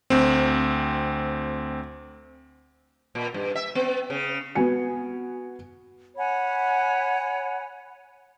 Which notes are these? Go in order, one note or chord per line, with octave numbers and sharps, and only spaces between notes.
D2 C4
A#2
G2
E5
B3
C#3
B3 F#4 G#5 C#7
C#5 F#5 G#5 B5